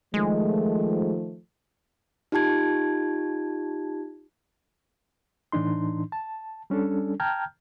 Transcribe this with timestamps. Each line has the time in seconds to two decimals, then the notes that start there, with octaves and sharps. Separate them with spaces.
0.14 D#3 F3 G#3 A3
2.32 D#4 F4 G4 A5 G#6
5.52 A2 E3 D4 D#4 C6
6.12 A5
6.70 G3 C#4 D4 A4
7.20 G5 A5 A#5 F6 G6 G#6